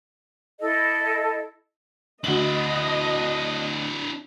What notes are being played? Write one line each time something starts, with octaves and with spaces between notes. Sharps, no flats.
E4 A4 D#5
D2 D4 E4 D#5 F#7